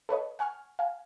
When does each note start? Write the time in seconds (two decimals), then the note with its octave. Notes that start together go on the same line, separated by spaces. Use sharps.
0.09 A4 B4 C#5 D#5
0.39 F#5 G#5 C#6 F6
0.79 F5 G#5